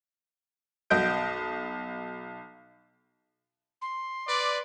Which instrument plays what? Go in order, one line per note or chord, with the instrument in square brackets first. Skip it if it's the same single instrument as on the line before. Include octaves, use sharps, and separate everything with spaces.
[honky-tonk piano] B1 F#4 D#5 G6 D7
[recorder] C6
[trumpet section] B4 D5